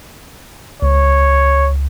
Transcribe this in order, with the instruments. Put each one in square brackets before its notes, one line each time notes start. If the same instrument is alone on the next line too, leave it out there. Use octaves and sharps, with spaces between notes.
[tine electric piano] C#2 [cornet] C#5